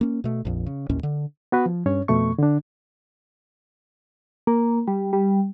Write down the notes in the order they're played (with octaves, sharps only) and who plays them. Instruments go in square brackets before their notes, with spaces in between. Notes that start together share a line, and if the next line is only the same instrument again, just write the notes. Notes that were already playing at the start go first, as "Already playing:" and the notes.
[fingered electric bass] A#3 C#4
B2 A3
A#1 F2
C#3
A1 D#2 A#2 C#4
D3
[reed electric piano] B3 F#4 B4
F3
G2 C#4 C#5
F2 B2 A3 C#6
D3 D4
[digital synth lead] A#3
G3
G3